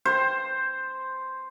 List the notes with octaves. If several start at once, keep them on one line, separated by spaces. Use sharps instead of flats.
C5